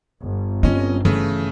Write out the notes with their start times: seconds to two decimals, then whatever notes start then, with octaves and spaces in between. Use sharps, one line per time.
0.22 G1
0.63 C4 C#4 F4 D#5
1.05 C#3 E3 A3